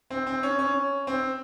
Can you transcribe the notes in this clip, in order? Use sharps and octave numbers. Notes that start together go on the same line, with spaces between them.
C4
C4
C#4
C#4
C4